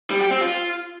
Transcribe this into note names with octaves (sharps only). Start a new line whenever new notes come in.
G3
G4
C4
F4